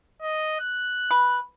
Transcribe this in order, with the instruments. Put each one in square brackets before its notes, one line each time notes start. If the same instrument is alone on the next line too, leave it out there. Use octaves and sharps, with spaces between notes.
[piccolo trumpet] D#5
F#6
[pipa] B4